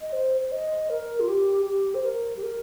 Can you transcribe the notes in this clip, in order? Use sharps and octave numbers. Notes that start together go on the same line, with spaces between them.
D#5
C5
C5
D#5
A#4
F4
G4
G4
C5
A#4
G4
A#4